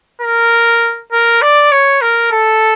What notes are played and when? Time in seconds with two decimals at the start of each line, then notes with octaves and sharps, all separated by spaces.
0.21 A#4
1.12 A#4
1.42 D5
1.71 C#5
2.01 A#4
2.31 A4